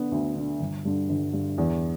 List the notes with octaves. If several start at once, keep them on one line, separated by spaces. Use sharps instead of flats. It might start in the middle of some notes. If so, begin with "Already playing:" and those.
Already playing: D3 B3
D2
D3 B3
G1
G2 D3
G1
G2 D3
E2